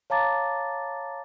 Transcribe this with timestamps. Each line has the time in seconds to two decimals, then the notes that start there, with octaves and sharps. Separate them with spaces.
0.10 C#5 F5 A5 A#5 D6 A6